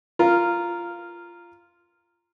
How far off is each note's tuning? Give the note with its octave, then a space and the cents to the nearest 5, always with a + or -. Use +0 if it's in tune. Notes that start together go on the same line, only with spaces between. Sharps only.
F4 -10 A#4 -5